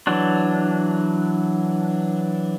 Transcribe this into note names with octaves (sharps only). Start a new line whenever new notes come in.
E3 F#3 D4